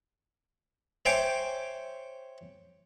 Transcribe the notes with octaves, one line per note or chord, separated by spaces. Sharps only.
C5 C#5 E5 G5 G#5 D6